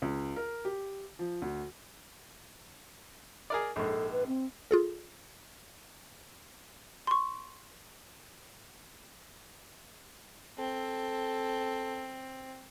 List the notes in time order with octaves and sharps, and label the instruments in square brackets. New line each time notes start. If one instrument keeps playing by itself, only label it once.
[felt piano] C#2
A#4
G4
F3
D2
[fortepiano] G#4 A#4 D5
[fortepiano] A#1 G#2 [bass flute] A4
[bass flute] B4
C4
[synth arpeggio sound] F4 G#4 A4
[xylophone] C6 C#6
[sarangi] C4 [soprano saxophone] A4